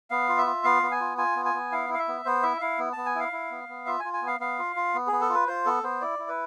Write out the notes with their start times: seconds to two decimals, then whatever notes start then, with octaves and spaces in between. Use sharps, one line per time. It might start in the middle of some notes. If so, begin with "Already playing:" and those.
0.10 B3 F5
0.29 F4
0.38 E5
0.46 F4
0.64 B3 F5
0.83 B3
0.91 G#5
1.00 F4
1.18 F4 G#5
1.36 B3
1.45 G#5
1.54 B3
1.72 E4 F5
1.90 E4 F5
1.99 E5
2.08 B3
2.25 B3 C5
2.43 E4 E5
2.61 E4 F5
2.79 B3
2.93 B3 A5
3.06 G#5
3.15 E4 F5
3.32 E4
3.51 B3
3.69 B3
3.86 F4 E5
4.00 G#5
4.05 F4
4.13 G#5
4.22 B3
4.27 F5
4.40 B3 F5
4.59 F4
4.76 F4
4.94 B3
5.07 G#4
5.12 B3
5.21 A4
5.30 F4 B4
5.47 F4 C5
5.66 B3 A4
5.83 B3 C5
6.01 E4 D5
6.19 E4
6.29 B4